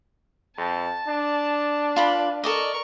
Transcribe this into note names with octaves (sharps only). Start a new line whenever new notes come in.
F2 A5
D4
F4 B4 B5
A4 A#4 D5 D#5 C#6